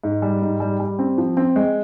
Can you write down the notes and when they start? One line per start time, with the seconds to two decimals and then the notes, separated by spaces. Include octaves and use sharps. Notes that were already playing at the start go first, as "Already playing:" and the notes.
0.04 G#2
0.22 G3
0.41 G#2
0.60 G3
0.80 G3
0.99 C4
1.18 F3
1.37 C4
1.56 G#3